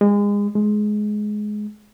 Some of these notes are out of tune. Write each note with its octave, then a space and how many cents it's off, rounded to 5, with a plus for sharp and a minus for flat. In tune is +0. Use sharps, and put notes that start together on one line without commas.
G#3 -30
G#3 +15